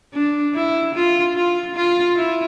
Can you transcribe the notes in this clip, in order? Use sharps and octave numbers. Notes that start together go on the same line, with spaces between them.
D4
E4
F4
F4
F4
E4